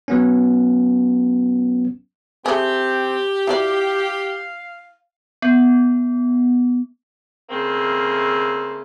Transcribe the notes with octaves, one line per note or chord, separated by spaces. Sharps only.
F#3 B3 C#4
A3 C4 G4 G#4
E4 F#4 D5 F5
B3
C#3 A3 A#3 C4